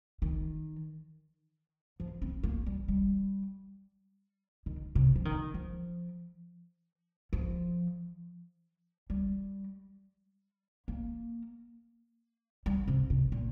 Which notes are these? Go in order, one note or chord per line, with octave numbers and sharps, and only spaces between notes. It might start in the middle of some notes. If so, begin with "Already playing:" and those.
D#3
F3
C4
A#3
G3
G3
D#3
C3
F3
D#3
F3
F3
G3
A#3
G3
C3
C3
A#2